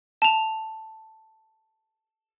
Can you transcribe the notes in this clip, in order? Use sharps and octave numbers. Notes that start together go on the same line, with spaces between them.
A5 F7